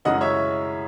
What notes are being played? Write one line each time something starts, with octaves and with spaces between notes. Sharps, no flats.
F#2 C#3 E3 G#3 D#5 F#5
C#5 E5